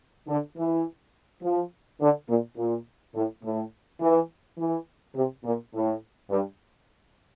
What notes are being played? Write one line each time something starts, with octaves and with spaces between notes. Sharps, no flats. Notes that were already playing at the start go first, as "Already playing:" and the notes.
D3
E3
F3
D3
A#2
A#2
A2
A2
E3
E3
C3
A#2
A2
G2